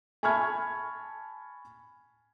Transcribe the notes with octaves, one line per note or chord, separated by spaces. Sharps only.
G#5 A5 B5 C#6 F6 G#6